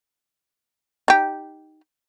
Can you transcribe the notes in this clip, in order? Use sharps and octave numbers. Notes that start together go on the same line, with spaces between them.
D#4 G4